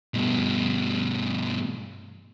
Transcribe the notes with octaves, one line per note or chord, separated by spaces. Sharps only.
G2 B2